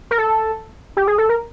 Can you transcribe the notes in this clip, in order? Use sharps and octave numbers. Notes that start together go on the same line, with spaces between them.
A#4
A4
G4
G#4
A4
A#4